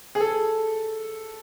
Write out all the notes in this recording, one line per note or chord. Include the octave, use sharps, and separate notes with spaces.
G#4
A4